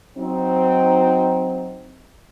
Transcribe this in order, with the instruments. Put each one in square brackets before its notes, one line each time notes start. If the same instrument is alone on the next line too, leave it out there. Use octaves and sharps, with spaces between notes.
[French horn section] F#3 C4 D#4